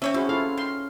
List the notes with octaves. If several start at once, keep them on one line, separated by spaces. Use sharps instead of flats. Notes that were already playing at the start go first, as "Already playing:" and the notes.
C4 C#4 C#5 E5
C4 E4 F#4 G#4
E4 F4 A4 F5
D#3 C6